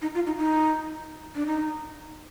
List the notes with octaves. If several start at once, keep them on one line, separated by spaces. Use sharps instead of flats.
D#4
F4
D#4
D#4
D4
D#4